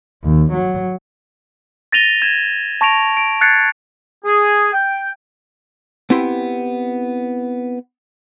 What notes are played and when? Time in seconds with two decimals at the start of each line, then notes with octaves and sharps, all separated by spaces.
0.24 D#2
0.53 F#3
1.92 A6 A#6 D#7 F7 G7
2.22 G#6 E7
2.81 A5 C#6 A#6 D7 F7
3.17 D7
3.41 F#6 G#6 A6 C7 C#7
4.25 G#4
4.73 G5
6.10 B3 C4 E4 G4 B4 C6